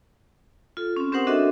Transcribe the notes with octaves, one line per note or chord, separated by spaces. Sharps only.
F4 A4
C4 C#4
C4 G4 A#4 C5 F#5 D#6
D4 F#4 A4 D#5 E5